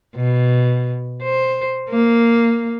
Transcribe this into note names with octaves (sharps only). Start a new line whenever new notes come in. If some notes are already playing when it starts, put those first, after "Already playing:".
B2
C5
A#3